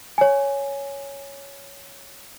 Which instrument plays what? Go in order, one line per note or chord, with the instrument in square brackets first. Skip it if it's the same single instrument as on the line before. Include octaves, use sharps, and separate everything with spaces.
[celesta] C#5 G#5